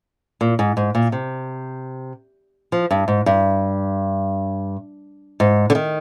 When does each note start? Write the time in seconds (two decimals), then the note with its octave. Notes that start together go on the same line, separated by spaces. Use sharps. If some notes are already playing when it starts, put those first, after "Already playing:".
0.41 A#2
0.59 G#2
0.77 G#2
0.95 A#2
1.12 C3
2.72 F3
2.91 G2
3.08 G#2
3.26 G2
5.40 G#2
5.70 D3
5.75 D#3